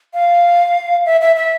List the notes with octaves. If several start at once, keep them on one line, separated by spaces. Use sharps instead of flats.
F5
E5
E5
E5